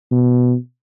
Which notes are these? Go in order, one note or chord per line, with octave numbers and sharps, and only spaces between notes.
B2